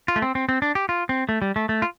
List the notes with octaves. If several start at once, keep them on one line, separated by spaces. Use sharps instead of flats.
F4
A3
C4
C4
C4
D4
G4
F4
C4
A3
G3
A3
A3
F4